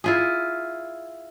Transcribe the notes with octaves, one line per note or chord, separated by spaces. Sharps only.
E4 F4 G#4